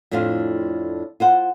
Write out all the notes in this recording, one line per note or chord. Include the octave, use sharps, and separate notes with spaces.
F2 A2 D4 F4 C5 F5
F4 C5 F#5